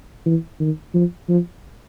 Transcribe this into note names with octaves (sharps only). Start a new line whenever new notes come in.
E3
D#3
F3
F3